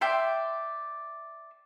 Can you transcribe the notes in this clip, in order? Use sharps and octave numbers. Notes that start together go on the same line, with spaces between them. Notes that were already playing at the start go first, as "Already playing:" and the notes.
D5 E5 G5 C6